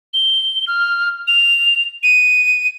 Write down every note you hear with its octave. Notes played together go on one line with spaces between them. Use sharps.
G7
F6
F7
D#7